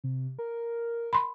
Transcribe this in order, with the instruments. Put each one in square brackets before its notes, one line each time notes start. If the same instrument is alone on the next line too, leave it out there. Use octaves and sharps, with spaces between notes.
[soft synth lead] C3
A#4
[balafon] B5 C6